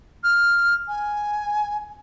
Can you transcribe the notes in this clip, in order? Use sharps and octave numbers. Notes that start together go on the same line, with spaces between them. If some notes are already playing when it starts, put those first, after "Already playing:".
F6
G#5